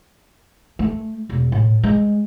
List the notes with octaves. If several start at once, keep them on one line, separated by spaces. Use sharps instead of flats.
A3
E1
A2
G#3